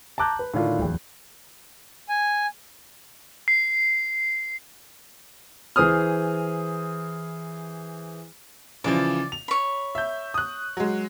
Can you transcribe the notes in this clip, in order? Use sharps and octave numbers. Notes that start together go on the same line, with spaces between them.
A5 A#5 D6 F#6 G6
B4
A2 D3 D#3 D4 F4
D1 E2
G#5
C7
E3 G#4 C5 D#6 F6
C#3 E3 F3 D5
F7
C#5 B5
E5 G6
D#6 F#6
F#3 G#3